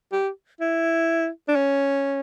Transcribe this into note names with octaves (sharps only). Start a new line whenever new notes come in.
G4
E4
D4
C#4